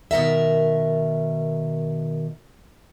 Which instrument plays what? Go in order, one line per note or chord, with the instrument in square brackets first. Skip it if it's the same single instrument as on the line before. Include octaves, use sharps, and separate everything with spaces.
[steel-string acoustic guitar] B2 D#3 A#4 E5